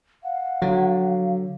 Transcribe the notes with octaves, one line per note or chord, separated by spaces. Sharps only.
F5 F#5
D3 F#3